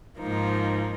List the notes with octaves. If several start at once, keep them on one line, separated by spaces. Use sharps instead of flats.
G#2 F3 A#3 D#4